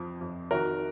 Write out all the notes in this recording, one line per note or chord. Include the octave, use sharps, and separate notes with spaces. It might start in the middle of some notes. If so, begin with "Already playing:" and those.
Already playing: F2 F3
F2
D#3 F#4 A#4